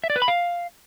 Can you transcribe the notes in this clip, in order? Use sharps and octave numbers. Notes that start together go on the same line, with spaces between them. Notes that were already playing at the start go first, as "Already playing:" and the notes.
E5
D5
B4
B5
F5